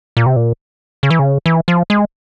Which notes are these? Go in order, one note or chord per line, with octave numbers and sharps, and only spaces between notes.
A#2
C3
A#2
C#3
E3
C#3
E3
F3
G#3